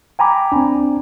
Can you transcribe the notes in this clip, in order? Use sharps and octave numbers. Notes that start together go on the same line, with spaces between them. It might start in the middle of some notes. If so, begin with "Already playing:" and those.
G5 G#5 A#5 B5 D6
C4 D4